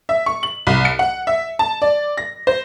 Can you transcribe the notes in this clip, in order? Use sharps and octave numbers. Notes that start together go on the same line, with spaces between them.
E5
C#6
F#7
C2
C#7
F#5
E5
A5
D5
A#6
C5